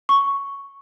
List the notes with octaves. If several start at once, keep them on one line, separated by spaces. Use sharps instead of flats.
C#6